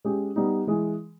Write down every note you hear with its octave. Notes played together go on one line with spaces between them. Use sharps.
G#3 C#4 G4
G3 B3 D#4
E3 G#3